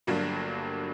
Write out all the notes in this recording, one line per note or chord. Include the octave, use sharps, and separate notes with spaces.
G1 G2 F#3 A#3 D4